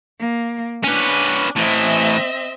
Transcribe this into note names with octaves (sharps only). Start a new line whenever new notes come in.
A#3
C#4 D4 B4
A2 E3 C4 D#5 E5